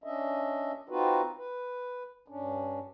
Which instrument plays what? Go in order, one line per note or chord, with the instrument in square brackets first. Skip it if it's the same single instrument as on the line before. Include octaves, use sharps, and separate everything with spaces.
[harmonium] C#4 D4 D#5 E5
C4 D#4 F4 F#4 B4
B4
G2 C#4 D4